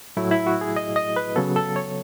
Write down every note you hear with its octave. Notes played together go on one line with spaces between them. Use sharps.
A2 F#3 A3 E4
E4
F#4
G#4
D#5
D#5
B4
C#3 F#3 B3 A4
A4
C#5